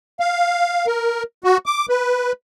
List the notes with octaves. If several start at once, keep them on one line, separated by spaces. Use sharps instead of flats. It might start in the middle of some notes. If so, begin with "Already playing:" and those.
F5
A#4
F#4
D6
B4